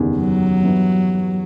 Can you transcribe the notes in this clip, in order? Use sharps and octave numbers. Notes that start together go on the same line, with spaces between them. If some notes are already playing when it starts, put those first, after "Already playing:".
Already playing: F#1 E2 D#3 G3 D#4
F#3
G2 E3 G3 B3 E4